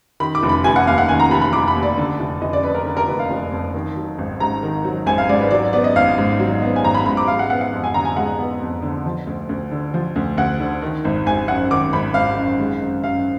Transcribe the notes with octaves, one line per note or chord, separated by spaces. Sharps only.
D#3 B5
D6
F1
B5
F1 G#5
F#5
D#2 F5
F#5
D#3 G#5
A#5
F1 B5
B5
F1 D6
B5
D#2
D5
D3
F1
F1 D#5
D5
F2 B4
A#4
D3 A#4
A#4
F1 B4
F5
F1
F2
D#3
F#3
G#1
G#2 A#5
D#3
F#3
G#1 G#5
F5
G#2 D5
B4
F#3 D5
B3 D5
D#5
G#1 F5
G#2
F#3
B3
G#5
G#1 A#5
B5
G#2 B5
D6
G#3 F5
F#5
B3 F#5
F#5
F2
G#5
D3 A#5
G#5
G#3 F#5
B3
F2
D3
F3
D2
D2
D3
F3
D2
D2 F#5
D3
D#3
G#1
G#1 G#5
F#2 F#5
D#3 D6
G#1 B5
G#1 F5
F#2
G#3
F#2
F#2 F5